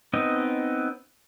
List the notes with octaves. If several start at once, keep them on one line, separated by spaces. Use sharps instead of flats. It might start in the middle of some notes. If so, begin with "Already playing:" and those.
B3 C4 D#4 D#5